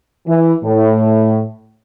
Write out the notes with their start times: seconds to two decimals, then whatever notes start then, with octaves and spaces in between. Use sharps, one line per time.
0.27 E3
0.64 A2